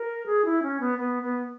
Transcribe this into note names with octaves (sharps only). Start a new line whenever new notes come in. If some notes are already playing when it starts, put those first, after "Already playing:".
Already playing: A#4
G#4
E4
C#4
B3
B3
B3